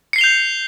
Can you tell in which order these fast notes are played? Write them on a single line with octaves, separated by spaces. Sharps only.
C#7 C7 G7 F7 G6